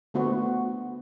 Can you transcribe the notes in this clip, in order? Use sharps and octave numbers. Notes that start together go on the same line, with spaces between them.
D3 A3 B3 F#4 C5